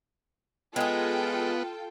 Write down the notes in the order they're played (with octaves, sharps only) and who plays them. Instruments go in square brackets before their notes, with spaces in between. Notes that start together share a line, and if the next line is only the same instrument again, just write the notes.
[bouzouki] G#3 G#4 [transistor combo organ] B3 [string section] F4 A4 G5